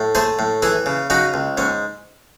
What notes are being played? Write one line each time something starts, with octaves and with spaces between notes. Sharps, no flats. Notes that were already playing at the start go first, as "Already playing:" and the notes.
Already playing: A2
A3 G#4 C5
A2
E3 E4 G#4
C#3
C#3 D#4 F#4
C#2
G#2 C#4